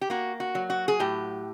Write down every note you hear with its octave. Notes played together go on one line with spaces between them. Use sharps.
G4
A#3 F#4
F#4
F#3
F#4
G#4
A2 G4